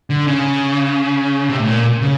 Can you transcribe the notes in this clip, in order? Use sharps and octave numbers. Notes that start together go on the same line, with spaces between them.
D3
C#3
C3
A2
A#2
C#3